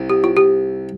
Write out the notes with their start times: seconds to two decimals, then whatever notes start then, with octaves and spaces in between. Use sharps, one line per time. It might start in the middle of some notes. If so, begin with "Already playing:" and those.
Already playing: C2
0.10 G4
0.24 F4
0.37 G4